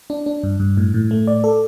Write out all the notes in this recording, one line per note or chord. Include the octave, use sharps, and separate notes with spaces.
D4
D4
G2
G2
A2
A2
A3
D5
A4